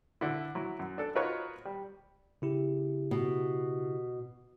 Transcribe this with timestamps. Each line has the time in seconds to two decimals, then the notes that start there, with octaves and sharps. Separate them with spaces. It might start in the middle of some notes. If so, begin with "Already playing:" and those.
0.21 D3 E4
0.55 F#3 E4
0.79 F#2
0.98 D4 A4
1.15 D#4 F4 F#4 A#4 B4 C#5
1.65 G3
2.42 C#3 E4 G4
3.11 B2